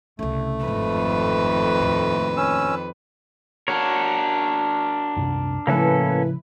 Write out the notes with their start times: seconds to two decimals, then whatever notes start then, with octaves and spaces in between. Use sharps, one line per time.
0.19 C2 C#3 A3
0.64 G1 F2 G#2 D#3 B4
1.80 D#2 A2
2.37 C#4 E6
3.68 D4 F#4 A#4 C#5
5.16 C2 F#2 C3
5.67 A2 C#3 F3 A#3 C#4 E4 A4 B4